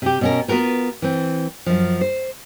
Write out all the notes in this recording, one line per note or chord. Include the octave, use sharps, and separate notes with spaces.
C3 G4
B2 C#4 A#4
B3 F4 F#4 A#4 B4
E3 C4
F#2 F3
C5